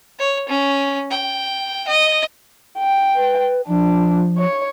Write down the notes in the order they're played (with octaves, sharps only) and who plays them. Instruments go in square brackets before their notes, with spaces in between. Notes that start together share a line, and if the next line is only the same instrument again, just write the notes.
[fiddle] C#5
C#4
G5
D#5
[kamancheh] G5
[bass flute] B4
[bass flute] F3 [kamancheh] D4
[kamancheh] C#5